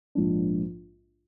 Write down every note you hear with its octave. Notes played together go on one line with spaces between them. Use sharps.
A#1 G#2 F3 A#3 D4